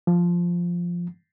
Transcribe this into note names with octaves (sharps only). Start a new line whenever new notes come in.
F3